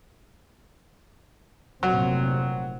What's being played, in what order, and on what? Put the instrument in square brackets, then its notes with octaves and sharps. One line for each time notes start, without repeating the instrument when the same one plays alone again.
[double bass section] F1 A#2 C4 [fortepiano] F#3